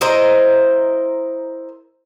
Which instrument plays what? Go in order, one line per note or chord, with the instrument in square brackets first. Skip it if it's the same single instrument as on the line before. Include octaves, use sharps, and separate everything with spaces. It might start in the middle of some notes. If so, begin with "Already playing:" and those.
[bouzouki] E4 A#4 C5 D#5